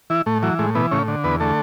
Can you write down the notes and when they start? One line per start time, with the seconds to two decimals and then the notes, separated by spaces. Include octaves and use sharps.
0.10 E3 E4
0.26 A2 A3
0.43 E3 F#3
0.59 A2 G#3
0.75 B2 E3 B3
0.91 A2 C#3 C#4
1.08 D3
1.24 E2 B3 B4
1.40 D3 A3 A4